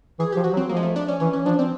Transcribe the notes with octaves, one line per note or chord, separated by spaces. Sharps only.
E3 G#4
F3 G4
F#4
F#3
C4
F3 A#3
G#3
A3
D4
C#4
E3 C#4
C#4
F3 D4
C4